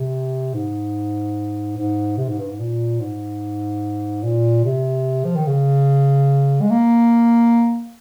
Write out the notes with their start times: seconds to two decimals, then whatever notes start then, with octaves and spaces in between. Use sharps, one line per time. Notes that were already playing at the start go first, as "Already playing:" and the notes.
Already playing: C3
0.54 G#2
1.77 G#2
2.17 C3
2.28 G#2
2.38 G2
2.49 G#2
2.59 A#2
3.00 G#2
4.23 A#2
4.65 C3
5.24 F3
5.36 D#3
5.47 C#3
6.61 G#3
6.70 A#3